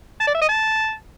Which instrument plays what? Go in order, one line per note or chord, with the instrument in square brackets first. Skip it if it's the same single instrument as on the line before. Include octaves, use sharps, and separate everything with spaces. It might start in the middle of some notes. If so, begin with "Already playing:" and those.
[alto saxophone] A5
D5
E5
D#5
A5